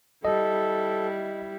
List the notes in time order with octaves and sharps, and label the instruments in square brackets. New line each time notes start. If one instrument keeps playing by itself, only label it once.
[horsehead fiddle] G3 E4 [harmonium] A4 [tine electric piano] D#5